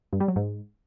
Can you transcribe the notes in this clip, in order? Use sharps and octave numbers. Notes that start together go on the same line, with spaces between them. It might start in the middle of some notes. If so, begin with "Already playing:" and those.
G2
G3
F#3
G#2